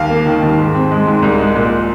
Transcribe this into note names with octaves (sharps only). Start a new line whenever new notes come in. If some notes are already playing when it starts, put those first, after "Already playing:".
Already playing: D#2 F5
A#3
D#3
D#2
G#2
C4
G#3
G#2
C2
G#3
A#2